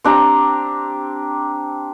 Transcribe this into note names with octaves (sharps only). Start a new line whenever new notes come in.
C4 D4 G4 A#5